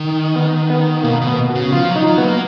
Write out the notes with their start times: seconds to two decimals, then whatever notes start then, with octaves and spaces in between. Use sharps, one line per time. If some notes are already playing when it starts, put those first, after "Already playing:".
Already playing: D#3
0.36 B3
0.70 B3
1.03 B2 A#3
1.21 B2
1.27 B3
1.50 F#4
1.55 C#3
1.72 F3 F4
1.90 F#3
1.96 D#4
2.07 F#3
2.18 B3
2.23 A#3